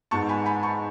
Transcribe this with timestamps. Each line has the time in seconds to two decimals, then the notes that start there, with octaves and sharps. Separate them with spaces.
0.11 G#2 G#3 B3 A5 C#6
0.29 G#5 B5
0.46 G#5 B5
0.63 A5 C#6